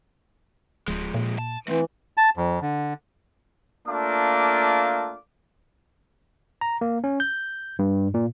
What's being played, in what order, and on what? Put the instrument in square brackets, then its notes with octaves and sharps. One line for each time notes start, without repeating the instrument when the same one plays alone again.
[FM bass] D1 [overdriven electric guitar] F3 G#3
[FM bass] A#2
[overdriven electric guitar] A5
[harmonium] E3 [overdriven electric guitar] A3 C4
[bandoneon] A5
F2
D3
[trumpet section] A3 A#3 D4 F4 D6
[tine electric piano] A#5
A#3
C#4
G6
G2
A#2